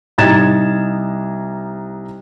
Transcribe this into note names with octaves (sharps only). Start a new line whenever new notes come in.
C2 D#4 A#5 G#6 A6 E7